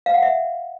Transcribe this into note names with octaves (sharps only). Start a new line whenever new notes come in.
F5
F#5
E5